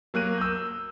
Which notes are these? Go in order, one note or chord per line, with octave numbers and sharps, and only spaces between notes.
F#3 A#3 F#6 D#7
E6 G6